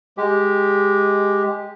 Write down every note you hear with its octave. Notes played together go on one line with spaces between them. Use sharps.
G#3 G4